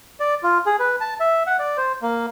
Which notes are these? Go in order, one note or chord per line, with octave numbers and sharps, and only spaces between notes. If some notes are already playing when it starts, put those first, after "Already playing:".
D5
F4
G#4
B4
A5
E5
F#5
D5
C5
A#3